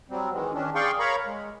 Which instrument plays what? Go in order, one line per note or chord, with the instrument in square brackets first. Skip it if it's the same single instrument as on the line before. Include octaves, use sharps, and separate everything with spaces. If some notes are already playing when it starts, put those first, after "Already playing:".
[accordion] F#3 G3 C4
D#3 E3 G#3
D#3 C#4 D4
G#4 D5 F5 G5 C6 C#6
A#4 C#5 F5 A#5 B5 C#6
G#3